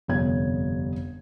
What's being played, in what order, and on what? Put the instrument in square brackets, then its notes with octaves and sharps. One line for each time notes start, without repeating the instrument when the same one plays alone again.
[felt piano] G1 F2 C3 C#5 G#6